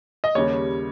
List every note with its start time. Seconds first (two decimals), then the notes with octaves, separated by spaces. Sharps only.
0.24 D#5
0.35 D#2 C#3 G3 C#5